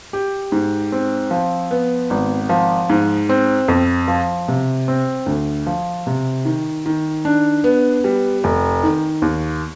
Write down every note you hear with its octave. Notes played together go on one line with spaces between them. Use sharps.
G4
G#2
C4
F3
B3
G#1
F3
G#2
C4
F2
F3
C3
C4
D2
F3
C3
D#3
D#3
D4
B3
G3
F1
D#3
D#2